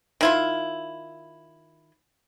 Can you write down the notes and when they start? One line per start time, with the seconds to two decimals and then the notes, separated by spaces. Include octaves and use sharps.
0.21 D#3 E4 F4